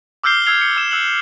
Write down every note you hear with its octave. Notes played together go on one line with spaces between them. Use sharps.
D6 E6 F6 G6 C7 G7
E6 F6 G#6 C7 F7
C#7
E6 E7
E6 F#6 F#7